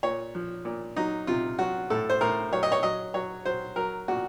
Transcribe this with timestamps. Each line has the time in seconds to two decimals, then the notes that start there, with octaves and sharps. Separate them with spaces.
0.03 A#2 C#5
0.35 F3
0.65 A#2
0.96 F#3 D#4
1.27 C3 F4
1.59 F#3 F#4
1.90 A2 A4
2.10 C5
2.21 A2 A#4
2.53 F#3 C#5
2.63 D#5
2.72 C#5
2.83 F#3 D#5
3.14 F#3 C#5
3.45 F#3 C5
3.76 F#3 A#4
4.08 A#2 F#4